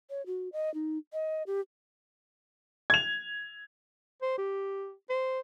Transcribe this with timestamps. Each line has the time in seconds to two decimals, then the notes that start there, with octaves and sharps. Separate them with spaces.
0.10 C#5
0.26 F#4
0.53 D#5
0.74 D#4
1.13 D#5
1.47 G4
2.90 G#6 F7
4.22 C5
4.38 G4
5.10 C5